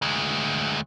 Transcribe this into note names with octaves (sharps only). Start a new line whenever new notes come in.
D2 G#3